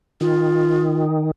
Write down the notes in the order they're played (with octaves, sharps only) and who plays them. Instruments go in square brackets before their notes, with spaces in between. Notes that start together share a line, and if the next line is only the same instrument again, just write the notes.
[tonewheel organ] D#3 [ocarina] F4